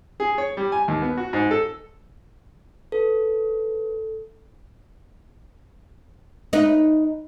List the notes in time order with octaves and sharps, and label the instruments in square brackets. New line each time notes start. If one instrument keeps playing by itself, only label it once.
[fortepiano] G#4
C#5
G3
G#5
D#2
B3
F#4
G#2
A4
[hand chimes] A4 [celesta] B4
[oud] D#4 B4